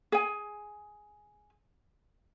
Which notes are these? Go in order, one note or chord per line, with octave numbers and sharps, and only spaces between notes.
G#4 G#5